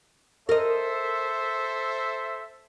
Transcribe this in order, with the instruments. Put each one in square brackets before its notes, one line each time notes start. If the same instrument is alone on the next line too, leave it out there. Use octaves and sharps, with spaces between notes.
[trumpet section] A4 C5 E5 [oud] A#4 D#5